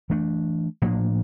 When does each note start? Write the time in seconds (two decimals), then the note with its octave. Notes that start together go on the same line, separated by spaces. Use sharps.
0.10 E3 A3 D4
0.82 A2 F3 A#3 D4